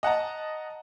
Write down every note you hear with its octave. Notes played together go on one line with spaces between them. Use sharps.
D#5 F#5 A5 A#5